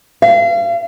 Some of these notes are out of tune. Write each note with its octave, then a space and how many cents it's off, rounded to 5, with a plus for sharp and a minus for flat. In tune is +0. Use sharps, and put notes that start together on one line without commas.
F5 -35